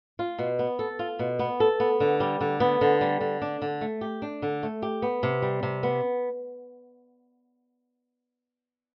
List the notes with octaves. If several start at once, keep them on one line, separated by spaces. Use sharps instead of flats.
F4
B2
B3
A4
F4
B2
B3
A4
B3
D3
G3
D3
B3
D3
G3
D3
D4
D3
A3
G4
D4
D3
A3
G4
B3
C3
G3
C3
B3